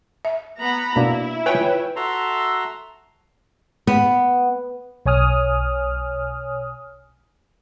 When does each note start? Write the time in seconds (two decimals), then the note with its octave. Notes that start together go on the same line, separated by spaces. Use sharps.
0.25 E5
0.60 B3 A#5 B5
0.96 B2 A#3 D4 E4
1.46 F4 B4 C#5 G5 G#5
1.96 F#4 A4 E5 A#5 C6
3.87 B3
5.06 B1 C#5 G#5 D#6 F6